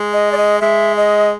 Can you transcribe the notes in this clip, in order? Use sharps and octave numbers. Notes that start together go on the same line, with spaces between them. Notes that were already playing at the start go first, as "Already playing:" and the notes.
Already playing: G#3
D#5
D5
D#5
G#3 E5
D#5